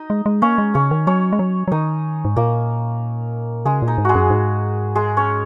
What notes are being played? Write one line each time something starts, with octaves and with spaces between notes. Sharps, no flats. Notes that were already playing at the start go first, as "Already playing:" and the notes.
Already playing: D#4 D#5
G#3
G#3
A#3 C#4 C#5
G#3
C#3 C#4 C#5
D#3
F#3 C#4 C#5
G#3
F#3
F#3
D#3 D#4 D#5
G#2
A#2 A#3 A#4
C#3 G#3 G#4
A#2
D#4
G#2
G#3 F#4 G#4
F#2
G#2
G#3 G#4
C#4 C#5